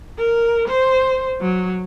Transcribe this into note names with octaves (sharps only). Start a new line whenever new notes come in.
A#4
C5
F#3